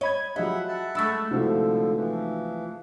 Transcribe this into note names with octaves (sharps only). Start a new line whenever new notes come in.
C#5 D#5 B5 G#6
F3 F#3 G4 G#4 D#5 E5 F#5 B5
E5 F#5 A5
G#3 A3 B5 C#6 E6 A6
C2 D3 F3 D#4 E4 F#4 C5 E6
E3 F3